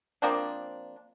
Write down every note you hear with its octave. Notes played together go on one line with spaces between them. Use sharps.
F3 A#3 C4 D4